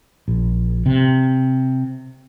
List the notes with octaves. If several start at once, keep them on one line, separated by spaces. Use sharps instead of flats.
A#1
C3